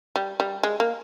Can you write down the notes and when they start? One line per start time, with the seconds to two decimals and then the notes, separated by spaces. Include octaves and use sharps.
0.16 G3
0.40 G3
0.63 G#3
0.80 A#3